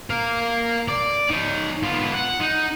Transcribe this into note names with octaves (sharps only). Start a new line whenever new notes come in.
A#4 F5
D5
D#4 C#5
B3 F4
F#5
D#4